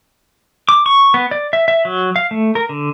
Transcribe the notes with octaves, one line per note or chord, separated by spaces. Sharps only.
D6
C#6
B3
D5
E5
E5
F#3
F5
A3
A#4
D3